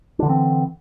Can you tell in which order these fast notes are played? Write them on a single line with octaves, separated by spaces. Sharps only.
D4 D3 E3 C4